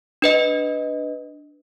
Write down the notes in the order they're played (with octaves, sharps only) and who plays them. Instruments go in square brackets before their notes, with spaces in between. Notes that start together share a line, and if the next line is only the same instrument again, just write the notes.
[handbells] D4 B4 D#5